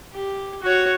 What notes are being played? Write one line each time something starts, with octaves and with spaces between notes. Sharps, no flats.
G4
F#4 C#5